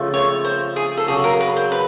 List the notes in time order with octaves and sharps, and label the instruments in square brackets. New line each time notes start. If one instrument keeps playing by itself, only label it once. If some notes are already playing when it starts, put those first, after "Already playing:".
Already playing: [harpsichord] C#2 C#3 F3 A3
[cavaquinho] C#5
C5
G#4
A4
[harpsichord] C#3 F#3 A#3 [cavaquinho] G#4
[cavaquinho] A#4
B4
C5
B4